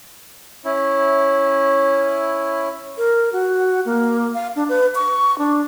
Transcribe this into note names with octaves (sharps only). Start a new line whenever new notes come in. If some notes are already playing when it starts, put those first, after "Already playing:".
C#4 E4
A#4
F#4
A#3
F5
D4
B4
C#6
D4